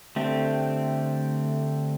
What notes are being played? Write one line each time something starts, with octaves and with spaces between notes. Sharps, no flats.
D3 A3 C4 G4